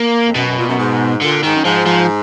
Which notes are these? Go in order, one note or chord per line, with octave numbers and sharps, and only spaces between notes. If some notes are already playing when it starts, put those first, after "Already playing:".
Already playing: A#3
F2
F#2 B2
F#2
A#2
F#2
G#2
A#2 D3
G#2 D#3
F#2
G#2 F3
F3